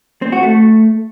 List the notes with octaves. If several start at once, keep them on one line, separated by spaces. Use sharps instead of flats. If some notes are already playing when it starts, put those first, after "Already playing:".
C4
F#4
A3